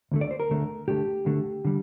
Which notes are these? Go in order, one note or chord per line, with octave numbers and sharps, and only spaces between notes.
D2 D3 A3
D5
C5
A#4
D2 D3 A3
D2 D3 A3 G4
D2 D3 A3
D3 G3